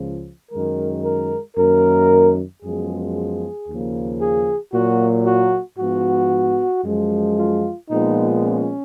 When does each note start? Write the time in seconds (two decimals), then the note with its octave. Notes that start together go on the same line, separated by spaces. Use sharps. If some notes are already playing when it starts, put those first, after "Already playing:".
Already playing: C#2 C#3 F3
0.52 F#2 D#3 G#3 A#4
1.05 A#4
1.57 F#2 D#3 A#3 A#4
2.63 F#2 F3 G#3 B3 G#4
3.15 G#4
3.68 D#2 C#3 F3 A#3
4.21 G#4
4.73 A#2 F#3 A#3 F#4
5.26 F#4
5.79 G#2 F3 B3 F#4
6.85 F#2 F3 G#3
7.37 F4
7.90 A#2 F3 G#3 B3 D#4
8.43 C#4